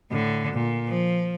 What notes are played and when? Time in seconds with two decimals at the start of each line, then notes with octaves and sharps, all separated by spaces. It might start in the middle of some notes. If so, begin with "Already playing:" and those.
0.12 A2 D3
0.53 A#2
0.89 F3